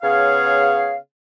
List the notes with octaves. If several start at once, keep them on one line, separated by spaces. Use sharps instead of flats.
C#3 B3 G#4 C#5 F5